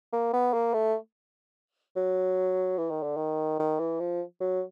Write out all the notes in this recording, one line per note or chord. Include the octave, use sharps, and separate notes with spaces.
A#3
B3
A#3
A3
F#3
E3
D#3
D3
D#3
D#3
E3
F3
F#3